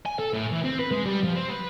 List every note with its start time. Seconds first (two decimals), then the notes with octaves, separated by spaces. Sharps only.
0.06 G#5
0.19 A4
0.33 A2
0.52 E3
0.64 C4
0.79 B4
0.91 G#3
1.05 G3
1.24 F3
1.36 C4
1.49 B4